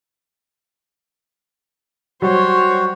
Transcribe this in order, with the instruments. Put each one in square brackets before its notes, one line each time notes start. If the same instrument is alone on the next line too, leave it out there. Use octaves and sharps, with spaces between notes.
[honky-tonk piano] F#3 G3 [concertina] F#4 [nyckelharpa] C5 C#5